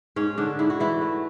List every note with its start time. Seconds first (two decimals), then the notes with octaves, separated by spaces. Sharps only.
0.16 G#2 C#4
0.38 G#2 D3 D4
0.59 G#2 E4
0.70 F#4
0.80 G#2 E3 E4
1.01 A3